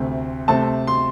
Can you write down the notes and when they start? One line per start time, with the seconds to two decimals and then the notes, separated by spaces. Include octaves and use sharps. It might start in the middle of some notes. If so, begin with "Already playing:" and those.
Already playing: D2 C3 A3 C4
0.48 C3 A3 C4 A5
0.87 C6